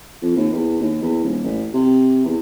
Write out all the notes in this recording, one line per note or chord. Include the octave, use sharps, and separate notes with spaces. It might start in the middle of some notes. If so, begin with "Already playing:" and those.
F2
D#2
E2
D#2
E2
D#1
A1
C3
E2